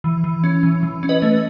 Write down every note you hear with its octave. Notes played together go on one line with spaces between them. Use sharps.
E3
E3
C#4
E3
E3
C#4
B4 D#5
A3